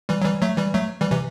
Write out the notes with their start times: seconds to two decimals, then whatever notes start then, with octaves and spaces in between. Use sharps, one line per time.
0.09 E3 G3
0.22 F#3
0.25 E3 G3
0.42 F#3 A3
0.57 E3 G3
0.74 F#3 A3
1.01 E3 G3
1.11 C3 E3